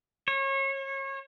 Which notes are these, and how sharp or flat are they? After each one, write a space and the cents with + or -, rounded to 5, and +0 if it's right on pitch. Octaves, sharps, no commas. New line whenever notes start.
C#5 -30